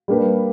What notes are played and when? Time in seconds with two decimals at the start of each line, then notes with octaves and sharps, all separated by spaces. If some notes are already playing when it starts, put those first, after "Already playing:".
0.08 G3 A#3 D4 G4 B4